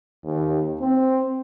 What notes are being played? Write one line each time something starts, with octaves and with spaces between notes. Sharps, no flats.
D#2
C4